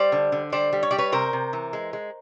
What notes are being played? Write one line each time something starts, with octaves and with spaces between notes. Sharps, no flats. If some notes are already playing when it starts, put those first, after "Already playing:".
Already playing: G3 C5 D5
D3
D3
G3 C5 D5
G3
C#5
G3 D5
B4 C#5
C3 A#4 C5
C3
E3
G#3
G#3